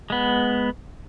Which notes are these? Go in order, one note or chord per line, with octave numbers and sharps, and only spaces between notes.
G#3 B3